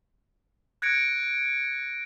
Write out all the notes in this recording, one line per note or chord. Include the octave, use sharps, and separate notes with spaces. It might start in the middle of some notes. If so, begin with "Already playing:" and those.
F#6 G#6 A#6 C#7 D7